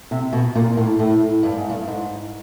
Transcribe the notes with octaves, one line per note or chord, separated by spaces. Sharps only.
C3
B2
A#2
A2
A2
G2
G#2
G2
G#2